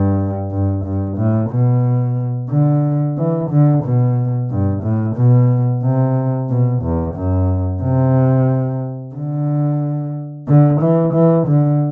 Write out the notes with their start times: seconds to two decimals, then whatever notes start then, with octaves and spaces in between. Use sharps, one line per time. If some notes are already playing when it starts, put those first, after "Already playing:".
Already playing: G2
0.51 G2
0.84 G2
1.17 A2
1.50 B2
2.50 D3
3.17 E3
3.50 D3
3.83 B2
4.50 G2
4.83 A2
5.16 B2
5.83 C3
6.49 B2
6.83 E2
7.15 F#2
7.82 C3
9.15 D3
10.47 D3
10.81 E3
11.13 E3
11.47 D3